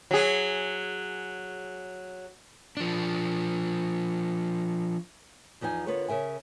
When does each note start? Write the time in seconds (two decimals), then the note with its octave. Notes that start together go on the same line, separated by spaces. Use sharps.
0.11 F#3 G#4
2.77 F3 D4
5.61 E2 F3 D#4 C#5 G#5
5.86 D3 B3 F4 A#4 B4 C#5
6.08 C#3 A#4 E5 G#5